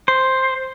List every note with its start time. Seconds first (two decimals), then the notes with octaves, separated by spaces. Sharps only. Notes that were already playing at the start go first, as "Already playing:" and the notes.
0.08 C5